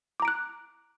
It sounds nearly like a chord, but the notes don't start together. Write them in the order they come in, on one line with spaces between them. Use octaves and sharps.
D6 A#5 D7 F#6